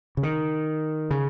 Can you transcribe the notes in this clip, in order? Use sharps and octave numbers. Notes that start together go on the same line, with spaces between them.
C#3
D#3
C#3